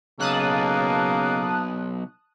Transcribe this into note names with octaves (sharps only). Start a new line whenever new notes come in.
B1 C#3 A#3 A5 D#6 F#6